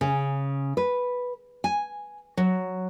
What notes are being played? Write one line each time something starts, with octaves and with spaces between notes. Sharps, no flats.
C#3
B4
G#5
F#3